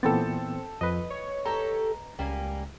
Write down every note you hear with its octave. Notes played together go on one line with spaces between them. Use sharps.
A#2 E3 B3 C4 A4 G5 A6
F2 B4 D#5
C#5
G4 A4 A#5
C#2 G3 A#3 G#5